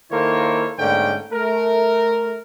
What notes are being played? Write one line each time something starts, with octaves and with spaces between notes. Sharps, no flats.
D#3 A#3 E4 A4 C5 C#5
G#2 D3 A3 A#3 C#4 G5
A3 A#4